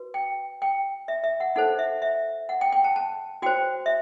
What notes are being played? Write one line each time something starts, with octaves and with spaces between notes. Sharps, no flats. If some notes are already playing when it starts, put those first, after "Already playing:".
Already playing: F#4 B4
G5
G5
E5
E5
F#5
D#4 A4 C5 F#5
E5
E5
F#5
G5
G5
A5
A5
F#4 C5 G5
E5